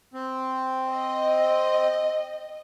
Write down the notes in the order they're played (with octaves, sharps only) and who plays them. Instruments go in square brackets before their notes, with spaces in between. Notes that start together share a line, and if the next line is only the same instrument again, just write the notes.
[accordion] C4
[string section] D#5